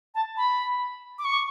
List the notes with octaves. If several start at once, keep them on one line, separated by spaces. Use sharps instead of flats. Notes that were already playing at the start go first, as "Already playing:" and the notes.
A5
B5
D6
C#6